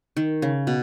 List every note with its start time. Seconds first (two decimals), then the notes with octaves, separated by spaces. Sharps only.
0.17 D#3
0.42 C#3
0.67 B2